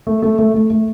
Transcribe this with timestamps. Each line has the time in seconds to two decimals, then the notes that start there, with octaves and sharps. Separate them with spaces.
0.07 A3
0.22 A3
0.39 A3
0.54 A3
0.70 A3